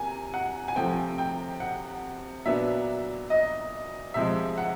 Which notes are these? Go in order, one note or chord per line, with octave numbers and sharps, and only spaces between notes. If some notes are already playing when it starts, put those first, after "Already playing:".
Already playing: C3 A#3 G#5
F#5
G#5
C3 F3 A3 C4 G5
G5
F#5
A#2 F#3 B3 D4 E5
D#5
C3 F3 G#3 E5
F#5